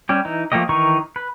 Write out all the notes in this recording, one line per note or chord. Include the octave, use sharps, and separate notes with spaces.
G3 C#4 G4
E3 D#4
F3 A3 A#3 G4 D#5
D#3 E3 D#4 A#4 C#6
B4